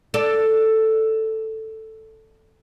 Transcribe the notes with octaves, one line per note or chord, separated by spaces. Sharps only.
A4 D5